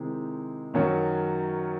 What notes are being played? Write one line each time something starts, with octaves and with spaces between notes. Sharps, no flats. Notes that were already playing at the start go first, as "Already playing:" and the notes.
Already playing: C3 D#3 G#3 C4 E4
F#2 D#3 F#3 C#4 F#4